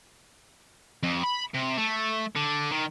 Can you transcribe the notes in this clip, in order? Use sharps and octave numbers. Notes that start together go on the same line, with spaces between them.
F2
B5
C3
A3
D3
D#3